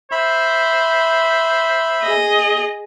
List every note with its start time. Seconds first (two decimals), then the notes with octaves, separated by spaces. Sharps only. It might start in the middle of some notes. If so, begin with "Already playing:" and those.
0.12 C5 E5 B5
2.03 G#4 D#5